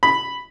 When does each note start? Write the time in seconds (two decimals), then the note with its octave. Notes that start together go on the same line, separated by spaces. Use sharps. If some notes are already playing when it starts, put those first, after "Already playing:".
0.03 B5